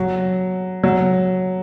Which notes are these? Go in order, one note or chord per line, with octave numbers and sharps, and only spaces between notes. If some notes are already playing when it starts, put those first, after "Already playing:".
Already playing: F#3
F#3